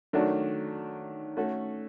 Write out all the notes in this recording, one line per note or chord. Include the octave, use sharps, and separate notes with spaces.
D#3 F#3 A3 D4 F#4
A3 C#4 F#4 A4